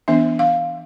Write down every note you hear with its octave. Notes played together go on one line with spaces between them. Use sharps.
E3 B3 D4 E5
F5